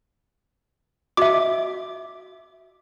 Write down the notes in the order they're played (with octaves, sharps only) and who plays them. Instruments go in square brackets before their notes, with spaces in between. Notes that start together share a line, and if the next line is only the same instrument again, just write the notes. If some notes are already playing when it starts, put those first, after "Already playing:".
[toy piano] F#4 D#5 [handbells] E5 D6